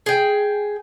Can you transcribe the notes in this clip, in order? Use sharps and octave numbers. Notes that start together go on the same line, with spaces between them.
G#4 G5